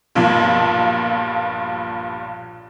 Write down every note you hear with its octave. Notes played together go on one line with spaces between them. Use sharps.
B1 G2 A#2 F3